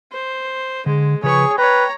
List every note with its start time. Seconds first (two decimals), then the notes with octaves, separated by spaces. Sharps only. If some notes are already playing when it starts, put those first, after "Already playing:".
0.12 C5
0.86 D3 G#3
1.23 C#3 F3 G#4 B4 C#5 C#6
1.58 B4 C#5 G5 A#5